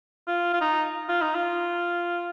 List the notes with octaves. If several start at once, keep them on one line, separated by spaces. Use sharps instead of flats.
F4
F4
D#4
F4
D#4
F4